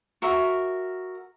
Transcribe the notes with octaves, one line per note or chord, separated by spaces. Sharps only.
F#4 A#4 E5